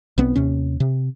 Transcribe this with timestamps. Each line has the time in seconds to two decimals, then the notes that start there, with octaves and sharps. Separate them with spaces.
0.18 B1 B3 C4
0.36 D#2 C3 C#4
0.80 C3